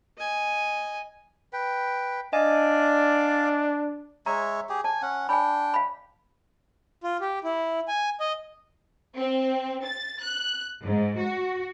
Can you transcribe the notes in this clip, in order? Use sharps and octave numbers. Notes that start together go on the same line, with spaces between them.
D#5 G#5
B4 G5
D4 D5 D#5 F5 G#5
G#3 C#5 E5 A#5
G4 G#4
G#5 A5
C#4 F#5
D4 G5 G#5 B5
F5 B5
F4
G4
E4
G#5
D#5
C4
A6
F#6
G#2
F#4